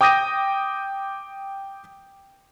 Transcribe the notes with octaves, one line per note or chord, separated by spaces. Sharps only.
G5 D6 D#6 G6 A#6 D#7